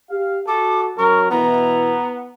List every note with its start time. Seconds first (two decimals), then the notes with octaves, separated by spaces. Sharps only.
0.10 G4 F5
0.47 F#4 A4 D6
0.98 F#2 F#3 C#4 A#4 C#6
1.31 B2 E3 B3 E4 A#5